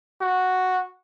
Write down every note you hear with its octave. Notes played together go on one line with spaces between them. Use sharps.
F#4